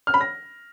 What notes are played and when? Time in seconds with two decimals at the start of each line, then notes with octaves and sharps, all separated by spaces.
0.07 F6
0.14 B5
0.21 A#6